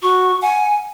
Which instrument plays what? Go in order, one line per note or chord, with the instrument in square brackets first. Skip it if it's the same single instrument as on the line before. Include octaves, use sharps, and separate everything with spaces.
[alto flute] F#4 [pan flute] C#6
[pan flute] F#5 [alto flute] G#5